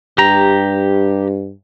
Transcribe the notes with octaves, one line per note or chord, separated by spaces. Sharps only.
G2 G4 A#5